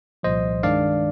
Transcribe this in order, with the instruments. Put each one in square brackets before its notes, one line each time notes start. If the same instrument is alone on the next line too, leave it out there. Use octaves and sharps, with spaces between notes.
[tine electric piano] C2 A#2 F3 C5 D#5
G2 D#3 G#3 D4 D5 F5